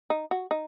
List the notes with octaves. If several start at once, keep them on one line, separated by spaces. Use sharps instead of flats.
D#4
F#4
D#4